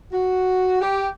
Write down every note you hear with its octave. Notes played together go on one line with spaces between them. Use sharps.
F#4
G4